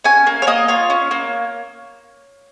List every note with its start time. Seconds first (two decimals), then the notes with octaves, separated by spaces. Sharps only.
0.04 C#4 G#5
0.27 A#3
0.42 C#5
0.47 A#3 D#5
0.68 F4 C#5
0.90 C#4
1.11 A#3